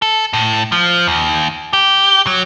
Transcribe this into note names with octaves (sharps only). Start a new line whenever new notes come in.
A4
A2
F3
D#2
G4
F#3